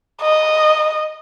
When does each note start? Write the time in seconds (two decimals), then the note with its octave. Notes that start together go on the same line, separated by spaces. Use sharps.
0.22 D#5